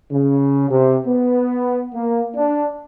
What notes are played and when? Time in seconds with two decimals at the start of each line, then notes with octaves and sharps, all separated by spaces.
0.11 C#3
0.70 C3
1.07 B3
1.94 A#3
2.36 D4